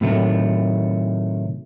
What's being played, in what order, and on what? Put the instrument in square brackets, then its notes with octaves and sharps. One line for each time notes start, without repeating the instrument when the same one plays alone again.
[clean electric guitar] A2 C3 D#3 F#3 A3